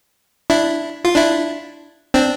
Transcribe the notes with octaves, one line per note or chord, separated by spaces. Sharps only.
D4 E4
F4
D4 E4
C4 D4